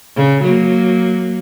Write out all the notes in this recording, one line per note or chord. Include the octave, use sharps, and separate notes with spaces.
C#3
F#3 A#3